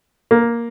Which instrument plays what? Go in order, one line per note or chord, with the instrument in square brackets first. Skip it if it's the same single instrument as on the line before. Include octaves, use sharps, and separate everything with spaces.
[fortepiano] A#3